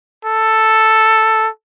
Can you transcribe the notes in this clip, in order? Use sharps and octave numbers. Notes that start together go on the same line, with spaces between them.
A4